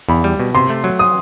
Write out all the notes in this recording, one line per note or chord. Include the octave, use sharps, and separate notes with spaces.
E2 B5
G3
B2
C3 C6
A3
F#3
D#6